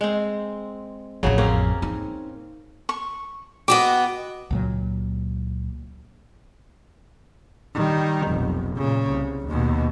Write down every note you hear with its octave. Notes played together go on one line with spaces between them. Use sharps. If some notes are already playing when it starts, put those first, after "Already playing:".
G#3 C4
A1 F2 C#3 F#3 G#4
A#3 C4 C#4
D#4
C#6
B3 F#4 D#5 G5 D6
C#2 A#2 F#3
D#3 G3
F1 B1
A#2 C#3
C2
D#2 B2